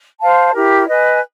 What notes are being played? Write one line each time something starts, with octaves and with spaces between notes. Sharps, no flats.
C5 F5 A5
E4 G4 A#4
B4 D#5 G#5